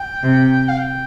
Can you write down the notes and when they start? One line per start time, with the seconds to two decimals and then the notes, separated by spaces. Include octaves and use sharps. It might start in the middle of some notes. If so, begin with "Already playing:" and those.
Already playing: G5
0.23 C3
0.69 F5
0.78 G5